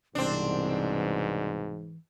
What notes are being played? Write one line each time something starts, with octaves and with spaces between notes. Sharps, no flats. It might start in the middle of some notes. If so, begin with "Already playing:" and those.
C2 G#2 B2 E3 C4 D4